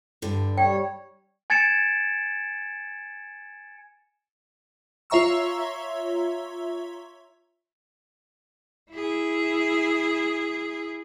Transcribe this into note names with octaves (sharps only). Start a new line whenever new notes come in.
G2 D3
G3 C#5 G5
G#5 G#6 A6 C#7 D7 E7
F4 C#5 E5 A#5 C#6 E6
E4 G#4